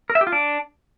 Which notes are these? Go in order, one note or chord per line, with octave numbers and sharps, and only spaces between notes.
A#4
E5
G4
F4
D4